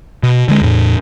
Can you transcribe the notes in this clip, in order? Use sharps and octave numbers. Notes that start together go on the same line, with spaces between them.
B2
D3 G#3
E2 A2